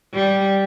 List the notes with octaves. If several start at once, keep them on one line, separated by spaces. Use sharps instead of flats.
G3